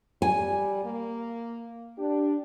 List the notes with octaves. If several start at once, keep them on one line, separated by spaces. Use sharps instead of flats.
G3 G#5
A#3
D4 G4